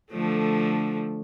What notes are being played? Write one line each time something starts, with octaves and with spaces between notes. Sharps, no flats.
D3 F3 A3